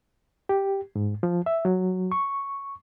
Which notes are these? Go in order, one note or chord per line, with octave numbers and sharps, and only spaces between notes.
G4
G#2
F3
E5
F#3
C#6